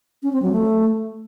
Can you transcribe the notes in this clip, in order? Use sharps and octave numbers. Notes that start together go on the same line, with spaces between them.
C#4
C4
F#3
A3